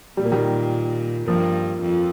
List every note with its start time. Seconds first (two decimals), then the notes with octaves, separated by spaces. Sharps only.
0.17 A#2 G3
0.25 A#3
0.32 D#3 G3
1.27 G2 F3 A#3
1.82 F2